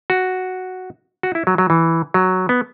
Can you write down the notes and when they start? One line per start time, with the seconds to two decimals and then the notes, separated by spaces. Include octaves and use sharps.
0.10 F#4
1.23 F#4
1.35 E4
1.47 F#3
1.58 F#3
1.70 E3
2.14 F#3
2.49 B3